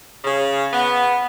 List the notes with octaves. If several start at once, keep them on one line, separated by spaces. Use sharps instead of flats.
C#3
B3